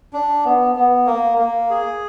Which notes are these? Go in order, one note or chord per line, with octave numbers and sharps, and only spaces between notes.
D4
B3
B3
A#3
A#3
G#4